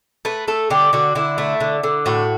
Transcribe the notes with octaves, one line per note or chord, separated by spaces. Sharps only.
A3 B4
A3 A4
D3 G4
D3 F#4
D3 E4
A3
D3
D3
A2 F#4